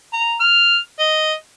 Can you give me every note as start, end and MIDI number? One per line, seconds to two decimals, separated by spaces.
0.13 0.35 82
0.40 0.78 89
0.99 1.33 75